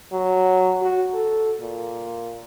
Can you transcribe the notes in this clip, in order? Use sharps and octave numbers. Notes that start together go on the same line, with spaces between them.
F#3
F#4
A4
A#2